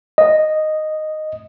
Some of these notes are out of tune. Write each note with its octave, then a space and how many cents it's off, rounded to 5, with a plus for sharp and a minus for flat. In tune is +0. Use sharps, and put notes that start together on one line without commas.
D#5 -5